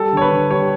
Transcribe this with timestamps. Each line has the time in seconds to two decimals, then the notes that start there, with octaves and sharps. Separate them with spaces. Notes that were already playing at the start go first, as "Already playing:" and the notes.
Already playing: G3 A4
0.13 D3 C#5
0.22 B4
0.31 D3
0.51 G3 C#5